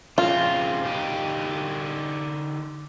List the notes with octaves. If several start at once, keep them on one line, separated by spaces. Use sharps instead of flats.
C#3 F3 C4 F4
D3 D#4 G4